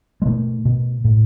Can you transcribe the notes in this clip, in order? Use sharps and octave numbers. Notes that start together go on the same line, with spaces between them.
G#3
B2 A3
B2
A2